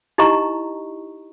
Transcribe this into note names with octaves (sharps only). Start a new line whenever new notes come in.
D#4 E4 G4 D#5 A#5 C#6